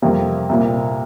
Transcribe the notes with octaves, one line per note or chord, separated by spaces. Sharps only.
F2 C3 G3 A#3
C2 A#2 A#3